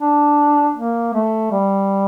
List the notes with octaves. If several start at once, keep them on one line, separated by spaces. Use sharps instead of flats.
D4
A#3
A3
G3